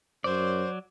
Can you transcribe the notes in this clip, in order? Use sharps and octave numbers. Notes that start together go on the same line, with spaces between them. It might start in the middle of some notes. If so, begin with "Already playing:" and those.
F#2 F#3 C5 D5